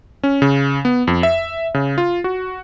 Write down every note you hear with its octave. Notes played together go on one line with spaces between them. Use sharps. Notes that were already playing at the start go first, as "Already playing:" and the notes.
C#4
C#3
B3
F2
E5
C#3
F4
F#4